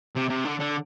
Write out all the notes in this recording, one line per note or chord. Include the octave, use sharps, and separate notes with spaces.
C3
C3
D3
D3